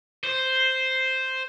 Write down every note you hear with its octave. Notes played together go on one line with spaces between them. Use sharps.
C5